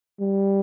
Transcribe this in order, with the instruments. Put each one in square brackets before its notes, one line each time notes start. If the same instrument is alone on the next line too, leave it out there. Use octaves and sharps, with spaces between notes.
[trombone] G3